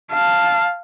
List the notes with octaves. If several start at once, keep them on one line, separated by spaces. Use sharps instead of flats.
F5 A5